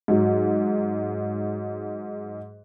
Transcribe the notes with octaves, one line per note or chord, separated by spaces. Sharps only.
G#2 F#3